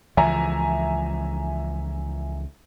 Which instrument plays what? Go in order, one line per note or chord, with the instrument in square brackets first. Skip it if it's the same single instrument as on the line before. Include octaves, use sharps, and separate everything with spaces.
[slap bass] C#2 E3 F3 [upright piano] E5 G#5 A#5